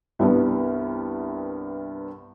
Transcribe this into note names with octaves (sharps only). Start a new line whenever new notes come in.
C2 G2 B3